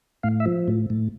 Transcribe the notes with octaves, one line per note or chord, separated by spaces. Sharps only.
A2 F5
E5
F3
A2
A2